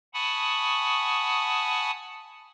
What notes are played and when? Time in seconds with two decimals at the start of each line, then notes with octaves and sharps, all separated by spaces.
0.14 F#5 G#5 A5 B5 C#6 D#6